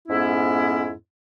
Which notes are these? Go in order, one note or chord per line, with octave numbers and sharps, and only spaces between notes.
F2 G#2 B3 C#4 E4